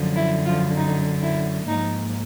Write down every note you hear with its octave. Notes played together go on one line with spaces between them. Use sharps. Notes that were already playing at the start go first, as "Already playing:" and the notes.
Already playing: F#2 D3 F3
E4
F3 F4
D#4
E4
G#2 F3 A#3 D#4